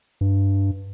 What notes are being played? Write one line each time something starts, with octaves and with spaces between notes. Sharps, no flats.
G2